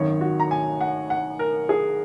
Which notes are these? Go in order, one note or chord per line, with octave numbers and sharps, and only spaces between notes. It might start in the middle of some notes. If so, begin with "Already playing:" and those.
Already playing: G#1 F#2 D#3 C#5
F#4
A#5
G#5
F#5
F#5
A#4
G#4